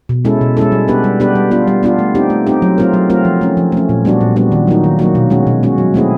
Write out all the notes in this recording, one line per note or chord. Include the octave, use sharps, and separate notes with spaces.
B2
G#3 C#4 E4 A4
B2
G#3 C#4 E4 A4
G3
B3 D4 G4 B4
G3
B3 D4 G4 B4
G3
B3 D4 F4
G3
B3 D4 F4
A3
C4 D#4 G4
A3
C4 D#4 G4
F#3
A3 C4 F4 A#4
F#3
A3 C4 F4 A#4
F3
A3 C#4
F3
A3 C#4
A#2
G3 B3 D4 F#4
A#2
G3 B3 D4 F#4
D#3
F#3 A#3 D#4 F#4
D#3
F#3 A#3 D#4 F#4
B2
G#3 C#4 F#4
B2
G#3 C#4 F#4
F#3
A3 C4 E4 G#4